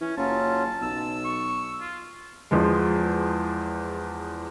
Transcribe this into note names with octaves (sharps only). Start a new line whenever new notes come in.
E3 C#4
F#1 F#3 C#4 F4 A5
B1 E6
C#6
F4
E2 F3 G#3